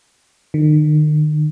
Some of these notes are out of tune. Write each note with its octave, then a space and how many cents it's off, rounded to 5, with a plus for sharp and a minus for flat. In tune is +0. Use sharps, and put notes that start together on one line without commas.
D#3 -40